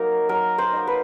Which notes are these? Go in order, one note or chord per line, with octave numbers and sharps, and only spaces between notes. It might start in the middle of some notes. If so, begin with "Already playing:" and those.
Already playing: F#3 A#3 D#4 A#4
F#3 A#4
C5
A#3 D#4
B4